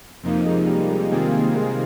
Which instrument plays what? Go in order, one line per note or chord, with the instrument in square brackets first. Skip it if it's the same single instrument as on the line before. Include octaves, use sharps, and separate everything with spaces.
[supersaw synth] F2 C3 F3 A#3 D#4
[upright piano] G#3
G3
G#3
[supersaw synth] C3 D#3 A#3 F4 G#4 [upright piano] C4
[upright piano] G#3